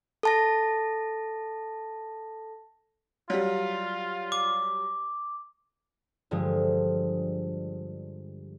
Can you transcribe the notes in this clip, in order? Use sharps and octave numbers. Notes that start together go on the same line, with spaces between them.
A4 A5 A#6
F#3 G3 F4
D6
G2 D3 F3 G#3